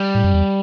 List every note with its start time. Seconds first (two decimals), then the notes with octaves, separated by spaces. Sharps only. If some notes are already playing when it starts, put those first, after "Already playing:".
Already playing: G3
0.15 A2
0.24 F#2
0.34 E2